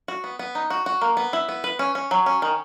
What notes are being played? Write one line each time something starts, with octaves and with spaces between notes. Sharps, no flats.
F#4
B3
B3
D#4
F#4
F#4
A#3
B3
E4
B3
B4
C#4
C#4
F#3
C#4
D#3